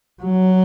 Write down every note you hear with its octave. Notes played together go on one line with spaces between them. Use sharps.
F#3